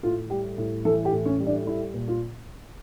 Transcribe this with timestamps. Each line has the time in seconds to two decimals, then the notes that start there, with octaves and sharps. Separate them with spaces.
0.03 A2 F4
0.30 G3 G4
0.58 A2
0.85 E3 A4
1.05 G4
1.12 A2
1.25 C#4
1.40 G3
1.47 D4
1.66 G3 E4
1.94 A#2
2.08 F4